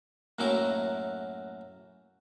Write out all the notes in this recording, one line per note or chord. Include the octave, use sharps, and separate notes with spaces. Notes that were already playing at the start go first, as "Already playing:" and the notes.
F#2 A2 F#3 A#3 E4 D6